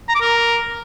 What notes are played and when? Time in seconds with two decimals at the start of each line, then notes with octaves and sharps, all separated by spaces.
0.09 A#5
0.15 D6
0.21 A#4